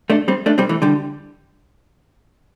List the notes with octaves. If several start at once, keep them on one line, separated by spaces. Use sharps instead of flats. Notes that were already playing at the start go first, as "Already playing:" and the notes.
A3 D4
G3 C4
A3 D4
G3 C4
E3 A3
D3 G3